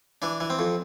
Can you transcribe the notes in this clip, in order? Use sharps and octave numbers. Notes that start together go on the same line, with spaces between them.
E3 D4
E3
C4
F2